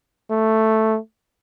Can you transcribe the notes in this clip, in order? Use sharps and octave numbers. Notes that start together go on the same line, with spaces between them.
A3